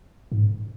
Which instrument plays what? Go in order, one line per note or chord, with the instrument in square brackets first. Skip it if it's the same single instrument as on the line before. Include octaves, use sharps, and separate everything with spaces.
[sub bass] G#2